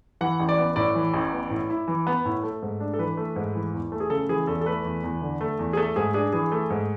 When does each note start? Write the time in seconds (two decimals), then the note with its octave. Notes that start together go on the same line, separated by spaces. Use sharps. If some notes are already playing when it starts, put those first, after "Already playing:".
0.21 E3 F#5
0.40 A1
0.49 D5
0.58 B3
0.76 A2 D5
0.95 E3
1.14 A1
1.32 B3
1.50 A2
1.70 E4
1.88 E3
2.07 B3
2.25 A2
2.43 A3
2.62 G#2
2.80 D4
2.94 A4
2.99 E3 B4
3.17 A3
3.36 G#2
3.55 E3
3.74 E2
3.92 A3
4.00 G#4
4.10 C#3 A4
4.29 E3 G#4
4.47 E2 A4
4.61 A4
4.66 A3 B4
4.84 E2
5.04 E2
5.22 D3
5.41 A3
5.59 E2
5.73 G#4
5.77 A3 A4
5.96 G#2 G#4
6.14 D4 G#4
6.33 E3 G#4
6.52 A3
6.70 G#2